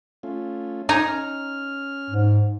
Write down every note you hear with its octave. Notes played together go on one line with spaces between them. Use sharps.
A3 C#4 F4
D#4 G#5 A#5
C#4 F6
G#2